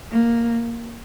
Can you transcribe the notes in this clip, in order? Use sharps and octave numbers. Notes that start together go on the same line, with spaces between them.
A#3